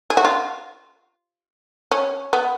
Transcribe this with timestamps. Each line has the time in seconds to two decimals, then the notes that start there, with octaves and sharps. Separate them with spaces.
0.10 G#4
0.17 F#4
0.25 F4
1.91 C#4
2.33 B3